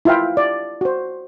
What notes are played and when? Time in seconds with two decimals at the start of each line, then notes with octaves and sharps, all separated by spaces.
0.05 E4 F4 E5 F5 G5
0.37 D5
0.81 F#4 C5